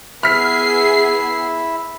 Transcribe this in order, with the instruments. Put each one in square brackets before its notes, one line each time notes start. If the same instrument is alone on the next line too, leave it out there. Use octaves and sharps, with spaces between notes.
[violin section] B3 G#4 C7 [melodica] E4 E5 [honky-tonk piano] F6 B6